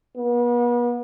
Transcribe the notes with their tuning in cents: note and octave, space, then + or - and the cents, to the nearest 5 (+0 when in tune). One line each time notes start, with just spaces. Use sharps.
B3 -40